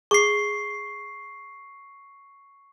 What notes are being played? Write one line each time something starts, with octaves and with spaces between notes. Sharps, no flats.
G#4 C#6 C7